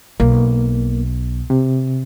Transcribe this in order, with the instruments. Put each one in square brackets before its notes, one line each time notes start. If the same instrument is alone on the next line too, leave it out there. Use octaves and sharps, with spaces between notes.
[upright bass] B1 [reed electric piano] A#3
[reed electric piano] C3